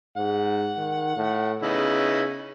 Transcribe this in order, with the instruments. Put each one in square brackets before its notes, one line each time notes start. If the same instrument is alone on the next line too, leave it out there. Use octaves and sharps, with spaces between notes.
[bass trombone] G#2 [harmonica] F#5
[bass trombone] D#3
A2
[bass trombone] C#3 [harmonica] B3 D#4 E4